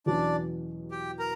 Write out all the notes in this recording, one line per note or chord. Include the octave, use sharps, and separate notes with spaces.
E2 B2 F#3 C#4 D4 F#4 D5
G4 G5
A#4 A#5